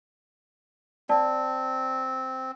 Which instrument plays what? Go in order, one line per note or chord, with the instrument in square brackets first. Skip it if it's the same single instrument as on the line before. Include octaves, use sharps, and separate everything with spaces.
[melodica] C4 [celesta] D5 A5